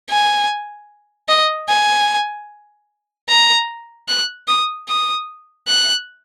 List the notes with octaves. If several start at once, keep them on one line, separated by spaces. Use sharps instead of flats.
G#5
D#5
G#5
A#5
F#6
D#6
D#6
F#6